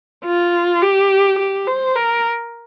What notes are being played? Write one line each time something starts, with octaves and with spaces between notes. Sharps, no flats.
F4
G4
G4
C5
A#4